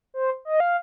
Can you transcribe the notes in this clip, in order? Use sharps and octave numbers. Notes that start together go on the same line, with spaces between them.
C5
D#5
F5